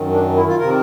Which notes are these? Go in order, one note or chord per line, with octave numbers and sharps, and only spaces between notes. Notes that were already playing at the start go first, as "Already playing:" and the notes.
Already playing: F#2 D#3
D4
E4
F4
C3 D#3 A#4